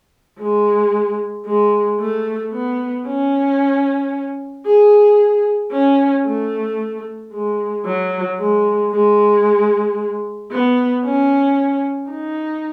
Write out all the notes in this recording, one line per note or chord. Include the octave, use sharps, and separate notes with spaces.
G#3
G#3
A3
B3
C#4
G#4
C#4
A3
G#3
F#3
G#3
G#3
B3
C#4
D#4